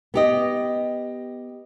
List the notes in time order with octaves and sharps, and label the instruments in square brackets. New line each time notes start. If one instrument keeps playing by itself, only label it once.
[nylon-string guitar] B3 G4 D#5